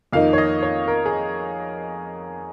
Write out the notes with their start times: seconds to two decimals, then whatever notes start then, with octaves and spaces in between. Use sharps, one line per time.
0.13 F2 D#3 A#3 D#4 F5
0.33 C#5
0.38 D#5
0.63 C#5
0.88 A#4
1.06 G#4